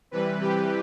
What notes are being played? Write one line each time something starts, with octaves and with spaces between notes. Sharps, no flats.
C3 E3 G3 B4
G4